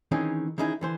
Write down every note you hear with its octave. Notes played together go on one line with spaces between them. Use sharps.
D#3 E3 C4 C#4 D#4 G#4
D#3 E3 C#4 D#4 E4 G#4
D3 E3 C5